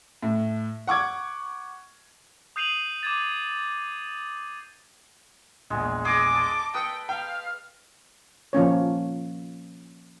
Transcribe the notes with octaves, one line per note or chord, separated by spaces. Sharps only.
A2
F#5 C#6 D6 G#6
D#6 G6 C7 D#7 F7 F#7
D6 G#6 A6
A#1 E2 G#3
G#4 D#5 D6
A5
B4 G5 D#6 E6 C#7
F5 G5
F3 A#3 C#4 C#5